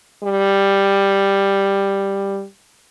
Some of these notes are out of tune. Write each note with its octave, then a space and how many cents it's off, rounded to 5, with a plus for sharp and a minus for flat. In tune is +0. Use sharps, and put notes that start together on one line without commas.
G3 +5